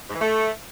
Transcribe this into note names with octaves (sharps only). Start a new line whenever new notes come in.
G#2
E3
A3